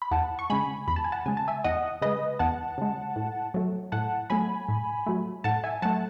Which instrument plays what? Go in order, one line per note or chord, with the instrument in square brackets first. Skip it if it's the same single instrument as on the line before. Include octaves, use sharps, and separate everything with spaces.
[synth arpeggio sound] B5
E2 F#5 A5
C#6
C#3 G#3 G#5 B5
E2 B5
A5
G#5
F#5 A5
C#3 G#3 G#5
A5
E5 G#5
E2 D#5 F#5
C#3 G#3 B4 D#5
E2 F#5 A5
C#3 G#3
A2
F#3 A3
A2 F#5 A5
F#3 A3 G#5 B5
A2
F#3 A3
A2 F#5 A5
E5 G#5
F#3 A3 F#5 A5